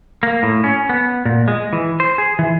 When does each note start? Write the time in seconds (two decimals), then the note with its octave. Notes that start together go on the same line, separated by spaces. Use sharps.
0.23 A#3
0.43 A2
0.64 C#4
0.89 B3
1.25 A#2
1.48 G#3
1.73 E3
2.00 C5
2.18 G#4
2.39 E3